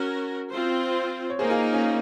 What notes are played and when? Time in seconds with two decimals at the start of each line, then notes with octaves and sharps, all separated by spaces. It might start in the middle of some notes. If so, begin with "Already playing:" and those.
Already playing: C#4 F#4 A#4
0.51 C4 F4 C5
1.30 C#5
1.39 A#3 D#4 G#4 A#4 C5
1.50 F4 G#4
1.73 C#4 F4